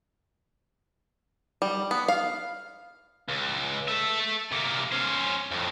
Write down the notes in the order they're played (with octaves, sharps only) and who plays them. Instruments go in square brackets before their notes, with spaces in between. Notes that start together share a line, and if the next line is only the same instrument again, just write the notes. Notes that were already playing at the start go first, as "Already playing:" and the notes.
[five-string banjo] G3
B3
F5
[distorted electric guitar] C#2
A4 E5
C3 A#3
C#4 C5
F2 A2